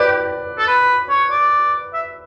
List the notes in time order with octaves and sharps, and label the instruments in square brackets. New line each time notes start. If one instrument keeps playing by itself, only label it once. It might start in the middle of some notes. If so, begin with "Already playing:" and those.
Already playing: [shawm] G4 [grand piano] B4 D5
[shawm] A4
B4
C#5
D5
E5